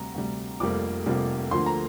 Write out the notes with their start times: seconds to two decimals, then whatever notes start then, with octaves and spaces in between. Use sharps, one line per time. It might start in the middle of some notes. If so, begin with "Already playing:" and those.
Already playing: D2 C3 G3 A#5
0.15 D2 C3 G3
0.60 F1 F2 C3 G3 A#3 D6
1.06 F1 F2 C3 G3 A#3
1.51 D2 D3 F3 A#3 C6
1.66 A#5